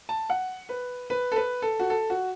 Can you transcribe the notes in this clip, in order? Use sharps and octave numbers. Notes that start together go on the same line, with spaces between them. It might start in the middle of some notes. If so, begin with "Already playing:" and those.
A5
F#5
B4
B4
A4
B4
A4
F#4
A4
F#4